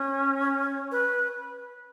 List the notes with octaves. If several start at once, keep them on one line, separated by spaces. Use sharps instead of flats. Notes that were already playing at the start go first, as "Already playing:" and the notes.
Already playing: C#4
B4